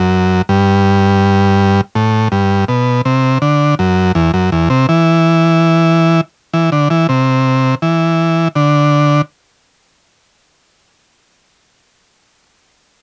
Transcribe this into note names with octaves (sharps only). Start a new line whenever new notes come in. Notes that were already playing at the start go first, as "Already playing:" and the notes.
Already playing: F#2
G2
A2
G2
B2
C3
D3
F#2
E2
F#2
E2
C3
E3
E3
D3
E3
C3
E3
D3